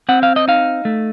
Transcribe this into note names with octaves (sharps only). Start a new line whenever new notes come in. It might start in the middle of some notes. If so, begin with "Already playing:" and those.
C4 F#5
F5
D#5
D#4 F5
A3